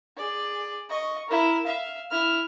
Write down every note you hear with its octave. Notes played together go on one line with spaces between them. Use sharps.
G#4 D5
D#5 C#6
E4 A#4
E5 F5
E4 F6